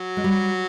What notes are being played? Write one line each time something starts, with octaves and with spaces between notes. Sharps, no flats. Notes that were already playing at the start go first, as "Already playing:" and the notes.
Already playing: F#3
G#3
G3